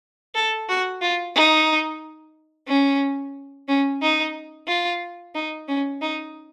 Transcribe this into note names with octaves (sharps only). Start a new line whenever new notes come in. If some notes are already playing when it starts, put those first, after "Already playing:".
A4
F#4
F4
D#4
C#4
C#4
D#4
F4
D#4
C#4
D#4